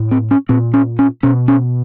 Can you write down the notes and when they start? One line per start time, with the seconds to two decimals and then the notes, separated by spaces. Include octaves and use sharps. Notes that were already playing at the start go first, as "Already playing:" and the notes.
Already playing: A2
0.11 C4
0.31 C#4
0.49 A#2 C4
0.74 C#4
0.99 C#4
1.23 B2 C#4
1.48 C#4